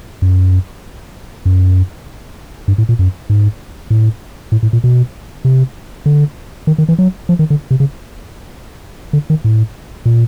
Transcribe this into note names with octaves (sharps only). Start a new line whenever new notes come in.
F#2
F#2
G2
A2
A#2
F#2
G#2
A2
A2
A2
A#2
B2
C3
D3
D#3
D#3
E3
F#3
F3
D#3
D3
C3
C#3
D3
D#3
A2
A#2